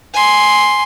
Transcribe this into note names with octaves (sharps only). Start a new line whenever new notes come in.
G#5 C6